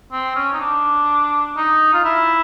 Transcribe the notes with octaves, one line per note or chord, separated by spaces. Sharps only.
C4
C#4
D#4
D4
D#4
F4
E4